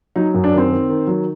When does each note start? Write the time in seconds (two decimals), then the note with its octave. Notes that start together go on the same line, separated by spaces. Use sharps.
0.16 F#3 D#4
0.34 F#2
0.44 D4
0.53 D#3 C4
0.71 D#3
0.89 D#3
1.07 F#3